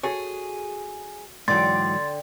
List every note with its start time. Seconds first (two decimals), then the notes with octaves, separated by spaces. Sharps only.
0.03 F#4 G#4 A4 C#5
1.48 G#2 D3 E3 F#3 G5 C6 A6